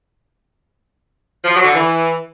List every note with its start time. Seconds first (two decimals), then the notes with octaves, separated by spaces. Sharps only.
1.44 F3
1.54 F#3
1.64 D3
1.75 E3